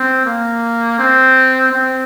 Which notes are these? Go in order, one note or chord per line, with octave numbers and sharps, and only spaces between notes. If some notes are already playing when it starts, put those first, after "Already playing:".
Already playing: C4
A#3
C4
C4